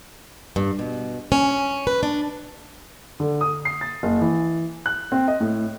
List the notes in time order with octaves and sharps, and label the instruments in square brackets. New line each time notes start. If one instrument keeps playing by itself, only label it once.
[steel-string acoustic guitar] G2
B2
C#4
B4
D4
[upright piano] D3
D#6
C7
A6
F#1
E3
F#6
C4
D#5
A2